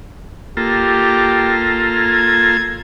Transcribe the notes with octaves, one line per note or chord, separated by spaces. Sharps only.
A#3 F4 G4 A4
G#6